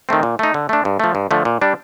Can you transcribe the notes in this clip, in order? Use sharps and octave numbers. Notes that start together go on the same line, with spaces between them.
D#3 A3 C4
A#2
A3 D#4
D3
A3 D4
G2
F3 A3
G2
D3 F3 A3
A#2
G3 D4